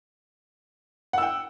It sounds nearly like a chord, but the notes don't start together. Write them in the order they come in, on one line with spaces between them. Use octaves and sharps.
F#5 E6 G5